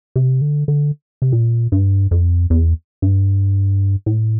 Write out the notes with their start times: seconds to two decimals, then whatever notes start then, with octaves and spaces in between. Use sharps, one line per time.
0.16 C3
0.41 D3
0.68 D3
1.22 C3
1.32 A#2
1.72 G2
2.11 F2
2.50 E2
3.02 G2
4.06 A2